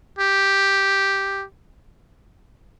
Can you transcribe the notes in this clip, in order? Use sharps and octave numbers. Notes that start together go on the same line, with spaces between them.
G4